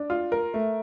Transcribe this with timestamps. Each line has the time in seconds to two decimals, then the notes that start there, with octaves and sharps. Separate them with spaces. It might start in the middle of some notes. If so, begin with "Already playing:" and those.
Already playing: D4
0.10 F4
0.32 A#4
0.54 A3